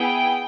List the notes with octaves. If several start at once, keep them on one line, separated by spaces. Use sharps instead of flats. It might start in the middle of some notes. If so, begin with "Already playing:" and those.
Already playing: B3 E4 G#4 G5